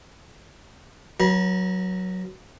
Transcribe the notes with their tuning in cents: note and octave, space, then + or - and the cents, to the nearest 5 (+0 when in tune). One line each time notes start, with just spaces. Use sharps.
F#3 +0 B4 -45